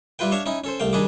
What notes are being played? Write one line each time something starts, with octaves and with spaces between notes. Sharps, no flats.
G3 E4 F4 B4 G5
D4 C#5 E5 F5
C#4 D#4 E4
C#4 A4 C5
C2 A3 F5 G5
D#3 G3 D4 G#4 B5 D6